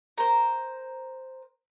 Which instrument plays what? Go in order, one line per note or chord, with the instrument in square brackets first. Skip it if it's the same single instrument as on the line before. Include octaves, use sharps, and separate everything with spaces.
[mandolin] A#4 C5